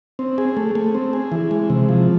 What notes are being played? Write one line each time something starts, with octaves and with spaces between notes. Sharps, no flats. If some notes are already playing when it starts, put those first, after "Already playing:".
C4
G#4
A3
A3
C4
G#4
E3
G#3
C3
F3